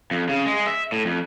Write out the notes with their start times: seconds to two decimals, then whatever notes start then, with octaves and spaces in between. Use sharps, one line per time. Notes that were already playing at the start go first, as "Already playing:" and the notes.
0.11 F2
0.29 C#3
0.46 G#3
0.67 E5
0.92 A2
1.05 F2